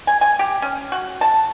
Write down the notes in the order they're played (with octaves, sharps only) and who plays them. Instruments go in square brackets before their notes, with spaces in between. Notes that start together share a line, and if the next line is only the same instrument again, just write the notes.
[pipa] G#5
G#5
G4
C#4
F#4
A5